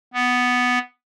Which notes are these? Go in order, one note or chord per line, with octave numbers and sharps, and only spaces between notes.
B3